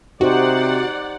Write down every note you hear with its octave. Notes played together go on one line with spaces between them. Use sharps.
C3 D#4 F#4 G4 C5 D5 F#5